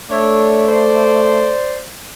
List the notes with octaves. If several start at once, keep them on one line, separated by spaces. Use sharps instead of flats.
A3 D4 C#5 E5
C5 D5